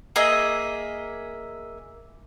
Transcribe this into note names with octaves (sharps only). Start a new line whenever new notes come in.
A#3 G#4 D#5 E5